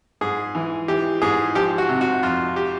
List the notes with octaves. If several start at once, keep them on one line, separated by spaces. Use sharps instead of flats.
G#2 G#4
E3
E3 G4
G#2 G#4
F3 G4
F#4
C3
F#4
F2 F4
G4